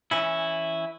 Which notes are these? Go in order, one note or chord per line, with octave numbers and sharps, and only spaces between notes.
E3 C#4 E4